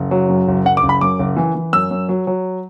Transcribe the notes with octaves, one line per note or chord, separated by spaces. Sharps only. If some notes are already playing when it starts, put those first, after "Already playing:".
Already playing: F#1
F#3
F#2
F#1
F#1 F#5
D6
F#1
B5
F#2 D6
F#1
E3
E3
F#2 E6
F#2
F#3
F#3